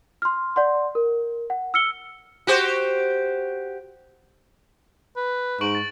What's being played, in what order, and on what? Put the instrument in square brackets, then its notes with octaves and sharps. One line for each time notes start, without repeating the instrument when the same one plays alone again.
[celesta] C6 F6
D5 F#5 C6
A#4
F#5
E6 F6 C#7 G7
[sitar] F#4 G4 C5
[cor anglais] B4
[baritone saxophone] G#2 [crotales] C#6 D7 F#7
[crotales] A6